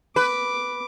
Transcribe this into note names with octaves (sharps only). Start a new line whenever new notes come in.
B4 D6